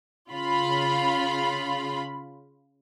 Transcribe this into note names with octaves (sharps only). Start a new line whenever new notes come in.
C#3 F4 B5